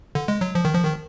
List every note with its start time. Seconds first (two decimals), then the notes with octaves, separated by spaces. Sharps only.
0.15 D3
0.28 G#3
0.41 F#3
0.55 F3
0.65 D#3
0.74 F3
0.85 D#3